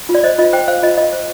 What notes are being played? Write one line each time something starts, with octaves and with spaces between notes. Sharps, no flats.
F4
D5
C5 D#5
F4 D#5
C5 G5
C5 F5
F4 D#5
F4 D#5
C5